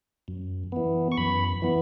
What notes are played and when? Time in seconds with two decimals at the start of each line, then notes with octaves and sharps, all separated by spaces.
0.28 F#2
0.72 E3 B3
1.12 C#6
1.17 F#2 B5
1.62 E3 B3